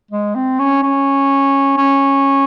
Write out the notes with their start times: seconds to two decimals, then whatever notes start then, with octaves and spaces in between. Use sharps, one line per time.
0.11 G#3
0.35 C4
0.59 C#4
0.82 C#4
1.77 C#4